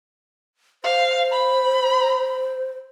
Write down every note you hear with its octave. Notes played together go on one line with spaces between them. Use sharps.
C5 F5
B5